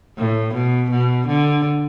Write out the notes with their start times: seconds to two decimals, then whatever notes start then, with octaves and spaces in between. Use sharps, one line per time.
0.18 A2
0.54 B2
0.90 B2
1.27 D3